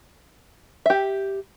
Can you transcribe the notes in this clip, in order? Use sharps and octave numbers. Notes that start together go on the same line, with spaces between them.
G4 E5